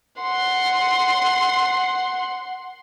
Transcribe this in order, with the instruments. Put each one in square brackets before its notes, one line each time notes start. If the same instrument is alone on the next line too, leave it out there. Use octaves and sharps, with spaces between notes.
[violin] F#5 C6